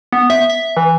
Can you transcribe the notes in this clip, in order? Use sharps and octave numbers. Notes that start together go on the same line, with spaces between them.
B3
E5
E5
E3